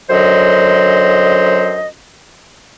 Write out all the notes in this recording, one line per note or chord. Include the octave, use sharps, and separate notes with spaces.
F#2 D3 F#3 C5 D#5